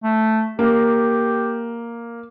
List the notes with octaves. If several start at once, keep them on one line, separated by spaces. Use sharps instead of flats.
A3
A#3 G4